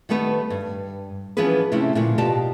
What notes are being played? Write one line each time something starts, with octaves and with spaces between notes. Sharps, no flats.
D#3 G3 A3 B3 B4
G2
E3 F3 B3 C#4 G#4 B4
C3 A3 C4 C#4 E4
A#2 D3 F3 A3
B2 D#4 F4 G4 D5 A5